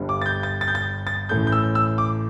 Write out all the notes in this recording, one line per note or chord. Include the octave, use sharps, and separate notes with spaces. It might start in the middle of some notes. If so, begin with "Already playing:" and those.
Already playing: G1 G2 G3
D6
A6
G6
A6
A6
G6
A6
A6
A1 A2 A3 G6
G6
E6
E6
D6